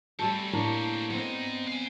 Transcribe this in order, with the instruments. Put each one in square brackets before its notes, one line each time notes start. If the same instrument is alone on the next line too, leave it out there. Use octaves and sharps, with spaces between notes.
[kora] G3 A3 A4 [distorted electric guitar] C4 C#4
[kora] A2 A#3 D4
[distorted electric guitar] G#2 D#4 [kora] B3 C4
[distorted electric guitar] F5 G#5